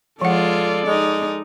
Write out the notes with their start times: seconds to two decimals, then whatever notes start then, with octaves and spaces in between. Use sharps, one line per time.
0.22 F3 G#3 F4 A4 D5 F#5
0.87 G#3 D#4